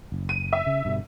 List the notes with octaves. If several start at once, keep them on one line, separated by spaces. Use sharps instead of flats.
F#1
D#7
E5
C#3
G2 B2 D3